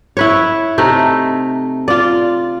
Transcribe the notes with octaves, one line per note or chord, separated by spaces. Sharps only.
E4 B4 C#5
C3 A3 D#4
F4 D5